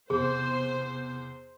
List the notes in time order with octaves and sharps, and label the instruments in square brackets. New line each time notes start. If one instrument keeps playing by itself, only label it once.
[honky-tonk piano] E2 [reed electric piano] C3 [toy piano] G#4 [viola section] C5